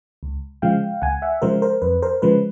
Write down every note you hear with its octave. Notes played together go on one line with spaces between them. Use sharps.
C#2
C#3 F3 G#3 F5 G5
C#2 F#5 G#5
E5 F#5
C#3 F3 G#3 A#4 C5
A#4 C5
F2 B4
A#4 C5
C#3 F3 G#3 B4